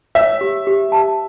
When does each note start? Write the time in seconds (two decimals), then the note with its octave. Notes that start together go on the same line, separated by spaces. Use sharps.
0.15 C#5 E5
0.41 G4
0.67 G4
0.92 A5